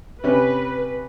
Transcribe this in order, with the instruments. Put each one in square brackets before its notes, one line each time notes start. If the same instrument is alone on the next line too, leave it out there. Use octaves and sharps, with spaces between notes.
[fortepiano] C3 C#4 [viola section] B4